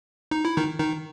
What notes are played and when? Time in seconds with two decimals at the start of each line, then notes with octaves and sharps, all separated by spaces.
0.31 D#4
0.45 E4
0.57 D#3 D#4
0.78 D#3 D#4